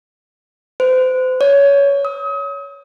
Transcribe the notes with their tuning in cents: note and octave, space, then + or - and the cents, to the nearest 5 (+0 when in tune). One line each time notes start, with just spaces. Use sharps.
C5 -35
C#5 +20
D#6 +40